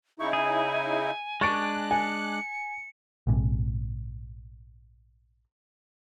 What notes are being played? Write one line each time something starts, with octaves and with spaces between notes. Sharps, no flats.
C#3 D#4 E4 C#6
G#4 G#5
G#3 D4 C#6 F#6 A6 D7
G#5 C#7
A#1 G#2 C3